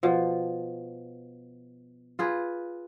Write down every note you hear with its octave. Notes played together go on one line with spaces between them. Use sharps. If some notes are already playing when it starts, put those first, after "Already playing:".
B2 F3
F4 G#4 B4